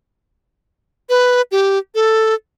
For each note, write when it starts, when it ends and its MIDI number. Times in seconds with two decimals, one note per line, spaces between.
1.09 1.42 71
1.51 1.78 67
1.95 2.34 69